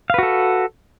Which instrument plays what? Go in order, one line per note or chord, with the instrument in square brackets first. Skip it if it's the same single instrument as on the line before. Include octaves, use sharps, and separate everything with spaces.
[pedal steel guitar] F5
B4
F#4
A4